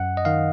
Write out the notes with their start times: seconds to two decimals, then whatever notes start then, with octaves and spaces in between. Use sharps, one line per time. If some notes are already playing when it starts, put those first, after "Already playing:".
Already playing: F#2 F#5
0.17 D#5
0.25 D#3 F5